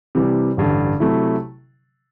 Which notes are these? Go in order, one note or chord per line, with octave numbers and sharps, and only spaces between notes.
C3 E3 G3
A1 G2 D3
C3 F#3 A3 E4